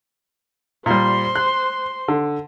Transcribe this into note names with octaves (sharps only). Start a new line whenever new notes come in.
A#2 G3 C5 C6
F#6
D3